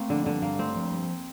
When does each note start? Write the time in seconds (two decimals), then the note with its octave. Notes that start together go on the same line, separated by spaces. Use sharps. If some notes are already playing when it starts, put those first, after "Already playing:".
Already playing: A3 A#3 C4
0.10 D3 F3
0.26 G2 D3
0.42 G2 A#3
0.59 A3 C4
0.76 F3
0.92 G2